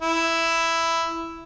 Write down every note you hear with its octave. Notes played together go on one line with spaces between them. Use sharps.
E4